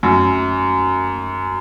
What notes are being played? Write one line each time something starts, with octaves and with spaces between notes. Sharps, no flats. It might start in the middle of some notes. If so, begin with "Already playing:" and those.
F#2